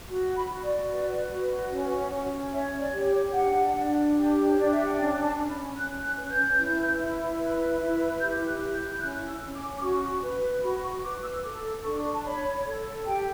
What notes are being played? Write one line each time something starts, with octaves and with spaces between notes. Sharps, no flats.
F#4
B5
F#4
D5
B4
F#4
C#4
C#4
C#5 E5
D5
G4
D4 F#5
D4
G4
C#5
D4 D5
E5
F#5
C#4 G5
A5
C#4
B5
C#4 F#6
F#6
B4
G6
E4
E4
B4
E4
G4 G6
F#6
E4
G6
G6
C#4 F#6
E6
C#4
D6
D6
F#4 C#6
B4
F#4 B5
C#6
B4 D6
E6
A4 D6
D4 C#6
A5
C#5 B5
A4
G4 G5